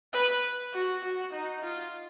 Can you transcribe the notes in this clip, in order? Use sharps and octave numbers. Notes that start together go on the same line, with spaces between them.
B4
F#4
F#4
D#4
F4